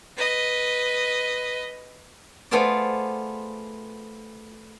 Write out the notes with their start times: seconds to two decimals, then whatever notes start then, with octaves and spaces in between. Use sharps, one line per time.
0.16 B4 D#5
2.51 A3 B3 F4 G#4 C5 D5